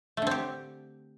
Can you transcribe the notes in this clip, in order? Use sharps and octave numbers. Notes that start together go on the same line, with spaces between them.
D3 A3 C4 G4